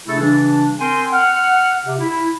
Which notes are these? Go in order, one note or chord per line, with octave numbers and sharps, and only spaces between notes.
C3 A3 D4 E4 G#4 A4
C#3 E3 G3 D4
C4 A#4 G5 G#5 C6
F#5 F6
C3
E4